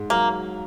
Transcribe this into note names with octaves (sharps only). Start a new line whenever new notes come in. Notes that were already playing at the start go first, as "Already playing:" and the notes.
Already playing: G#2
F#3 A#3